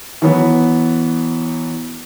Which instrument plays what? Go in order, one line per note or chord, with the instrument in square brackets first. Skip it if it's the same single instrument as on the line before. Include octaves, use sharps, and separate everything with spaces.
[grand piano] E3 F#3 B3